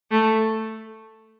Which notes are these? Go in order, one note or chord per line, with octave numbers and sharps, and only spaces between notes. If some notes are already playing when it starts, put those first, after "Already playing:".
A3